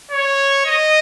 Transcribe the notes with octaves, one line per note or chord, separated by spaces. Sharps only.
C#5
D#5